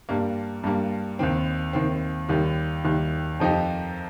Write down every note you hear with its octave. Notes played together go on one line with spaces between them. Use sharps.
G2 G3 A#3
G2 G3 A#3
D#2 D#3 C4
D#2 D#3 C4
D#2 D#3 G3
D#2 D#3 G3
F2 F3 D#4 G4